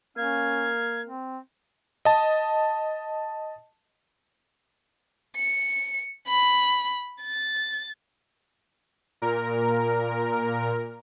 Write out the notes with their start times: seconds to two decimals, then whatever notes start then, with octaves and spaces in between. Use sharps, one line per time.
0.17 A#3 C#4 F5 G#6
1.06 C4
2.05 D#5 A5
5.37 C#7
6.28 B5
7.23 A6
9.22 A#2 A#4